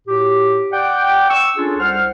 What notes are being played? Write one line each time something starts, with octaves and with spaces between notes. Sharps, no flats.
A2 F#4 G4
D5 F#5 G5
C#6 E6
C#4 D4 F4 G#4 A4
C2 C5 F#5 F6